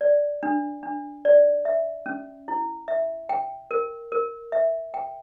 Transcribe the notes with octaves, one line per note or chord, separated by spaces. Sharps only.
D5
D4
D4
D5
E5
C#4
E4
E5
G5
A#4
A#4
E5
G5